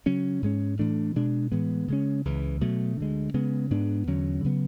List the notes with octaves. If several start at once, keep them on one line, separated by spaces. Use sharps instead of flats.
C#3 F#3 C#4
G#2 G#3 C#4
A2 E3 A3 D4
B2 G#3 D4
A2 E3 G#3 B3
C#3 G#3 C#4
C#2 C#3 E3
B2 F#3 A3
D2 D3 G#3
C#3 G#3 B3
G#2 G#3 B3 D4
E2 D3 F#3 C#4
C#3 F#3 B3